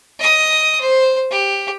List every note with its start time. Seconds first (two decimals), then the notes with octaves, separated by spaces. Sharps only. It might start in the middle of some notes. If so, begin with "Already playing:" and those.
0.19 D#5 D#6
0.81 C5
1.31 G4